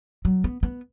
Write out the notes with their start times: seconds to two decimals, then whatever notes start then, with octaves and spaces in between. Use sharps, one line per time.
0.25 F#3
0.44 B3
0.63 B3